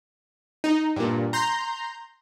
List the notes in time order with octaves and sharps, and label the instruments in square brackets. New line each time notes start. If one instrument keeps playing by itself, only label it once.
[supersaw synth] D#4
G2 A#2
A#5 C6 G6